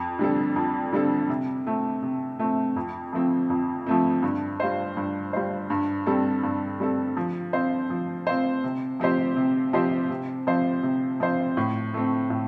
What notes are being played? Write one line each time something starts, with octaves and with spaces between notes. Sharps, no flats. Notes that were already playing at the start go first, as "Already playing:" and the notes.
Already playing: F2
D3 G3 C4 A4
F2
D3 G3 C4 A4
C3
A3 C4
C3
A3 C4
F2
F3 A3 C4
F2
F3 A3 C4
G2
G3 F4 C5
G2
G3 F4 C5
G2
G3 C4 A4
G2
G3 C4 A4
F3
C4 F4 C5
F3
C4 F4 C5
C3
F3 C4 G4 C5
C3
F3 C4 G4 C5
C3
F3 C4 F4 C5
C3
F3 C4 F4 C5
A2
A3 C4
A2